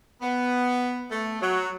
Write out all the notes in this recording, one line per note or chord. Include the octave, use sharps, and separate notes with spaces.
B3
A3
F#3